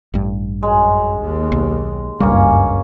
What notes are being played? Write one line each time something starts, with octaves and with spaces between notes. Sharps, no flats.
A1 G2
F#2 G#3
D#2
B1
F#1 C#2 G2 G3 A#3 C#4 G#4